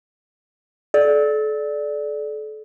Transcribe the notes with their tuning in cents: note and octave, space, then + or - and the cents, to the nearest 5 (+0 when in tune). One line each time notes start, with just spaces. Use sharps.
A4 -35 D5 +0